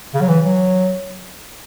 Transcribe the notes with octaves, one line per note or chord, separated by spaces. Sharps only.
C#3
F#3
E3
F#3